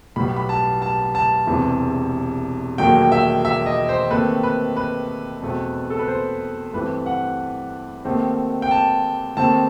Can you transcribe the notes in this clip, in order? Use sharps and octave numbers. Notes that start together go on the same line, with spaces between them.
B1 A2 G3 B3 B5
B5
A5
A5
A5
E1 E2 C3 E3
E1 D#2 D#3 F#3 A3 G5
E5
E5
D#5
C5
D#2 D#3 A3 C4 B4
B4
B4
E2 B2 A3 C4
A4
B4
C5
G2 E3 A3 C4 B4
F#5
D#2 D#3 A3 C4
G5
A5
D#2 D#3 A3 C4 A5